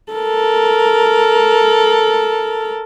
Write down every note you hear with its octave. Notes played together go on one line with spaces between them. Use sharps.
A4 A#4